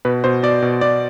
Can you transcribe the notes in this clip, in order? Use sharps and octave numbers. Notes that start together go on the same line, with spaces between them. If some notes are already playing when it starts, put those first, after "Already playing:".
B2 B4
B2 C5
B2 D5
B2
B2 D5